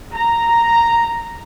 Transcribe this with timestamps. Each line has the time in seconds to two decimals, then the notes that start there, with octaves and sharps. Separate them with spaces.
0.14 A#5